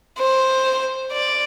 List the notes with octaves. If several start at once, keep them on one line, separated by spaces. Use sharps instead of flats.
C5
D5